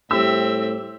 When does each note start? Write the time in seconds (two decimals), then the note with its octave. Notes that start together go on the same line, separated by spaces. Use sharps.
0.11 A2 G3 C4 G4 E5 E6